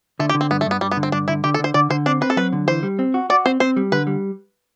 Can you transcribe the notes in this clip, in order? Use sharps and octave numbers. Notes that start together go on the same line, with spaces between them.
D3 A3
G4
D3
C4
G2 B3
A3
G2 B3
G2 G3
B3
D3
C4
G2 D4
D3 E4
D3 G4
A4
D3 C5
D3 D5
D3 C5
C4 D4
C4 B4
A4
F#3 B4
D3
E3 C5
G3
C4
F#4
F#4 D5
C4 C5
C4 C5
G3
D3 B4
G3